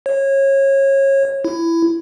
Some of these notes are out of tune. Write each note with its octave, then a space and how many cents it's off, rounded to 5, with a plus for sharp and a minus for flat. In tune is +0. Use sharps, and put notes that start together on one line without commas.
C#5 -25
E4 +15